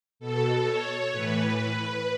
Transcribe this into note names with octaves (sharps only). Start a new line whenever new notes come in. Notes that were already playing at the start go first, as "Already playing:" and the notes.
B2 A4
C#5
A2 E3 B4